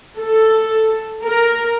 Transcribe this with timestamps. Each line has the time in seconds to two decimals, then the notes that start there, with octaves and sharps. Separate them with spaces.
0.20 A4
1.25 A#4